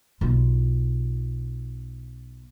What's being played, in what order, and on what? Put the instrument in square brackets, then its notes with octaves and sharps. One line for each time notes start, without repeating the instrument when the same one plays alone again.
[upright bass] B1 F4